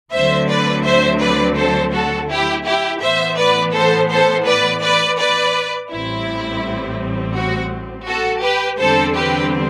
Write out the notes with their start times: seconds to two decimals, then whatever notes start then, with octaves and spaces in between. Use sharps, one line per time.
0.12 D2 D3 F#3 A3 C4 C5 E5
0.48 B4 D5
0.84 C5 E5
1.20 B4 D5
1.56 A4 C5
1.93 F#4 A4
2.29 E4 G4
2.65 E4 G4
3.01 A2 E3 B3 C5 E5
3.37 B4 D5
3.73 A4 C5
4.09 A4 C5
4.46 B4 D5
4.82 B4 D5
5.18 B4 D5
5.90 A1 A2 G3 C4 E4
7.34 F#4
8.07 F#4 A4
8.42 G4 B4
8.79 E2 D3 G3 C4 A4 C5
9.15 G4 B4